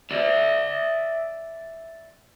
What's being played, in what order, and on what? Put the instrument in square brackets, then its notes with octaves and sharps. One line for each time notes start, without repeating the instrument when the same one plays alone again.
[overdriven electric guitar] D5 E5